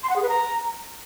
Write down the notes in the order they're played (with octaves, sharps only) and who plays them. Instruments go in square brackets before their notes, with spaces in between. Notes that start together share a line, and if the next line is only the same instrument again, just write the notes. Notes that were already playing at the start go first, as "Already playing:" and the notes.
[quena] C6
F#5
G#4
B4
A#5